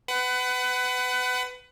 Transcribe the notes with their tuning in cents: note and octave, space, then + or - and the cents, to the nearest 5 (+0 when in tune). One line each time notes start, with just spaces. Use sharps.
B4 +25 F#5 +20